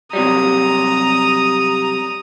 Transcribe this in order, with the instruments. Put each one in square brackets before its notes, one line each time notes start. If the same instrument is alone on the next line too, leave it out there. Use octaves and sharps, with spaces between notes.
[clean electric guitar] C3 F#3 G3 [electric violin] A#5 D#6